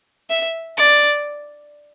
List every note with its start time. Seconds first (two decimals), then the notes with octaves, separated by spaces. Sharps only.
0.30 E5
0.77 D5